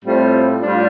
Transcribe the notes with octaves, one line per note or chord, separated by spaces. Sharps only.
A2 G3 C4 F4
A2 G3 D4 F4